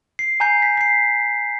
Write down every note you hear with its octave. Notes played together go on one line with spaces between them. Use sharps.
C7
G#5 A#5 G6 C7
B6
B6 C7